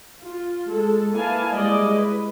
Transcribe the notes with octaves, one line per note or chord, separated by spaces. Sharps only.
F4
G#3 A4
A#3 E4 B4 F5 G#5 A5
G3 G#3 E4 D5 D#5
B4